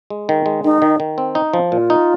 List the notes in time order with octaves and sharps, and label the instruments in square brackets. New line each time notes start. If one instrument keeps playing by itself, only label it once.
[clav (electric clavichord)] G#3
D#3
G#3
[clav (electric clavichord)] D#3 [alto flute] D#4
[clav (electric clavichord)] D#3
D#3
C4
D#4
F3
[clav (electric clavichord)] A#2 [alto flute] F4
[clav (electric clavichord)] D#4